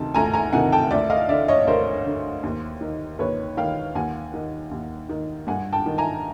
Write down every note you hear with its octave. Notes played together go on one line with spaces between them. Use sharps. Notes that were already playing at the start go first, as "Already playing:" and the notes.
Already playing: D2 C3 D#3 A5
D2 G#5 A#5
G#5 A#5
C3 D#3 F#5 G#5
G5 A5
D2 D5 E5
D#5 F5
D3 D5 E5
C#5 D#5
D2 A#4 C5
D3
D#2
D#3
D#2 B4 C#5
D#3 F5 G5
D#2 F#5 G#5
D#3
D#2
D#3
G2 F#5 G#5
G5 A5
D#3
G#5 A#5